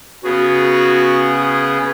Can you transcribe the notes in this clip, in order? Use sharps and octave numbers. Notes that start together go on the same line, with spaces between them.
C#3 B3 F#4 G#4